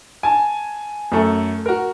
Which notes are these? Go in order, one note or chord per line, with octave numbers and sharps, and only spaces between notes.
G#5 A5
F#2 A3 A4
F#4 A#4